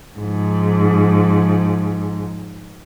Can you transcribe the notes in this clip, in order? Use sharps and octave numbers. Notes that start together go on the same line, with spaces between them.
G#2 F3